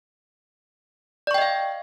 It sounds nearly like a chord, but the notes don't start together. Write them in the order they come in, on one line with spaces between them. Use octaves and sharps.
D5 C#6 G5 D#5 F5